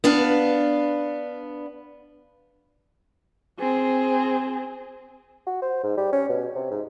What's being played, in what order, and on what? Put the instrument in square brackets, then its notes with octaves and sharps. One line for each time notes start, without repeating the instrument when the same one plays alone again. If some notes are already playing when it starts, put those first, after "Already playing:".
[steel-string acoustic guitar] B3 D4 F5
[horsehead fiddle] C4 G#4
[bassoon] F#4
C5
G#2
G3
C#4
B2
C3
G#2